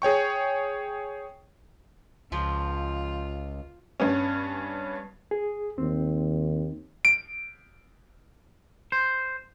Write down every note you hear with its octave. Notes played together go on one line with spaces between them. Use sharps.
G#4 C#5 G5 C#6
C#2 F3 F4
G2 B3 C#4
G#4
D#2 C4
D7
C5